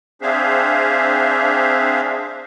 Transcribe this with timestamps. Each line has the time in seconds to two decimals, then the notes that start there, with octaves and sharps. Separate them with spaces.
0.22 C4 D4 G#4 C5 E5 F5